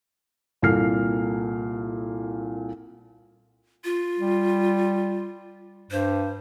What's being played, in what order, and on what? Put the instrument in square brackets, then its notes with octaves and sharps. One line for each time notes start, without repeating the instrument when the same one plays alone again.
[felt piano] C2 A#2 A4 F6 C7
[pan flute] F4
[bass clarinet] G3
[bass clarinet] G2 [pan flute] C5